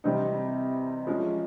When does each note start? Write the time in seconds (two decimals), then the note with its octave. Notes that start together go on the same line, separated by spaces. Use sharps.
0.04 C3 E3 G3 C4 D#4
1.07 F3 G#3 C#4